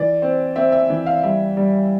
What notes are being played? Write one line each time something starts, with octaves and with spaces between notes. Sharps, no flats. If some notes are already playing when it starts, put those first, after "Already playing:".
Already playing: E3 D5
C4
C4 E5
E5
E3
F5
G3 E5
G3